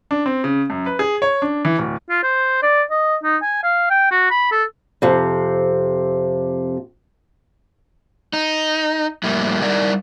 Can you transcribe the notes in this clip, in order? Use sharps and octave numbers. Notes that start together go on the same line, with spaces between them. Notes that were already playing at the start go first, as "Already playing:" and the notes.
D4
C4
C#3
F#2
B4
G#4
C#5
D4
E3
D1
F4
C5
D5
D#5
D#4
G#5
F5
G5
F#4
B5
A4
F2 C3
D#4
F2 A2 G3 A#3 E4
G3 D#4 E4 A#4 D5 F#5